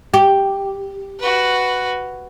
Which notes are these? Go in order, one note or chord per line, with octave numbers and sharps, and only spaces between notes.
G4
F#4 B4